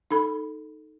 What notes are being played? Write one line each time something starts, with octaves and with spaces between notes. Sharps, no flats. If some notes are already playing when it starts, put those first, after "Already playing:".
D#4 A4 B5